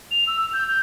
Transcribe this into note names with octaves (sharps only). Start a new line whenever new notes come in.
F7
E6
G6
G6